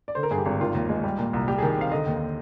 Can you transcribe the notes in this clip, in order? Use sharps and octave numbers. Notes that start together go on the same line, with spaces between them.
D5
D3 C5
A#4
G2 G#4
G4
G#1
D#3 F4
D#2
G#3
G3
A#2
C2
G3 G4
D#3 G#4
C4 F5
D3 D#5
D#2